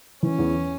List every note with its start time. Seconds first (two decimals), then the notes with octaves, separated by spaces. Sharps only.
0.23 E3 C#4
0.39 E2